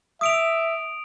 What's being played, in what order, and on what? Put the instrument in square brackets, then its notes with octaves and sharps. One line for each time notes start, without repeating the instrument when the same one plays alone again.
[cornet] E5 [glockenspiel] D#6 D7 F7